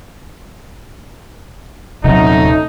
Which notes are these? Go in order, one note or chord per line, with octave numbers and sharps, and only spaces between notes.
D#1 C3 F#3 A3 C#4 D#4